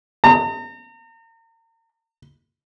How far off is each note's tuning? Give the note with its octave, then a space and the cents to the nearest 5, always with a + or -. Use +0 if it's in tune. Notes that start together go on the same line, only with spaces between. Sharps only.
A#5 -40